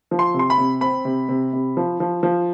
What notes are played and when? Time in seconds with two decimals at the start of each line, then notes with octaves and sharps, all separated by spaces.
0.11 F3
0.19 C6
0.34 C3
0.39 C6
0.50 B5
0.58 C3
0.81 C4 B5
1.05 C3
1.29 C3
1.53 C3
1.77 F3
2.00 F3
2.23 F3